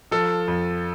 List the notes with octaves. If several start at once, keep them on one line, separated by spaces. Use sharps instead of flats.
F3 A4
F2